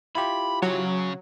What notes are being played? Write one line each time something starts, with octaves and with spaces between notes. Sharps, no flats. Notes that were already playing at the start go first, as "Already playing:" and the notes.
E4 F4 G4 B5
C#3 F#3 C#5